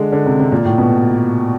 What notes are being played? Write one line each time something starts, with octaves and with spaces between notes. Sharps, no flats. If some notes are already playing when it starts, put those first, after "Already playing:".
Already playing: D3 G#3
D3
C3
C3
A#2
A2
B2